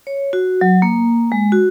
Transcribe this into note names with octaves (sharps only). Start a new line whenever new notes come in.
C#5
F#4
F#3
A#3
G#3
F#4